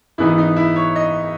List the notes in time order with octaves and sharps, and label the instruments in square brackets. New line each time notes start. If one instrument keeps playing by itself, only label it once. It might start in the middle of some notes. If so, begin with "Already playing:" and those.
[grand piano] G#1 G#2 E3 B3 D#4 E4
D#4
E4
C#5
D#5